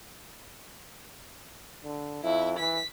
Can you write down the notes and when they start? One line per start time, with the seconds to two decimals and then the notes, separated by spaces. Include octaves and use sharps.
1.84 D3
2.24 F2 E4
2.59 E3 B6